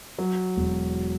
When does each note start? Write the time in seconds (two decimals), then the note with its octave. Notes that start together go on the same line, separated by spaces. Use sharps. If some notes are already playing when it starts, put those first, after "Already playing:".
0.18 F#3
0.57 E1